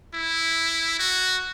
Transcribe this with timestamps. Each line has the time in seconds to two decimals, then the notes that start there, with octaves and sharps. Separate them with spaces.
0.14 E4
0.99 F#4